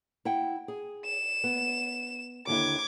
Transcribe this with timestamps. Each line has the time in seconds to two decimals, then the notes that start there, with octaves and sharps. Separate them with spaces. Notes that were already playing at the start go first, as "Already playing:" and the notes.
0.25 E4 F#5 G5
0.68 G#4
1.06 E7
1.44 B3
2.47 D#2 D3 E4 D6 G#6